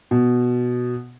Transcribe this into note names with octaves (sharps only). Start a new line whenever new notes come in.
B2